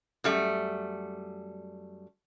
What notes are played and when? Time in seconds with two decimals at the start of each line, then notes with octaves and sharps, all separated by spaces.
0.24 F#2 G3 A3